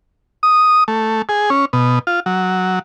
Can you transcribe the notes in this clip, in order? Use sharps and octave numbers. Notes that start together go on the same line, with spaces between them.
D#6
A3
G#4
C#4
B2
F4
F#3